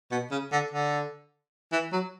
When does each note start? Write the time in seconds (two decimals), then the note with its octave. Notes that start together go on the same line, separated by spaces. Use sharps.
0.12 B2
0.31 C#3
0.52 D3
0.71 D3
1.72 E3
1.93 F#3